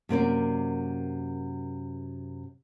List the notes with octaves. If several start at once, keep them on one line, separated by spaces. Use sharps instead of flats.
F#2 C3 A#3 D5